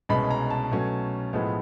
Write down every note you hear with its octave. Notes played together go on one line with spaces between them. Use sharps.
C2 B2 G#3 C#4 B5
A#5
A5
B2 F#3 A3 C#4
A2 F3 G#3 B3